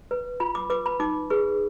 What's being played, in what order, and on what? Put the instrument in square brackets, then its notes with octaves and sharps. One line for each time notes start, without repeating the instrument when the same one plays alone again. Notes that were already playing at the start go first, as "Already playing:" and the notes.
[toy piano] B4
F4 B5
D6
B4 D6
B5
D#4 D6
G#4 B4